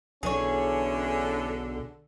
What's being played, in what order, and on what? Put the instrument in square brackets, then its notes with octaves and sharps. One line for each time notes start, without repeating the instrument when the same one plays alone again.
[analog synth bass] B1 [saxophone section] D3 [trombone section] E3 C#4 [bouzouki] G#4 C#5